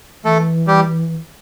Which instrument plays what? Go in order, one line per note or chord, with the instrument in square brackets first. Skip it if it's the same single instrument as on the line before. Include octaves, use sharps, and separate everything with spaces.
[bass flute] E3 [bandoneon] A3 A4
[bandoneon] G3 G4